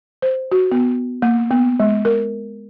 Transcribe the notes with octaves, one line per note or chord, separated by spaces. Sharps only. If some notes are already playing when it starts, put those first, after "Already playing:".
C5
F#4
B3
A#3
B3
G#3
A#4